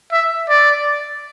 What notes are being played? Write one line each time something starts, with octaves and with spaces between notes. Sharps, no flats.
E5
D5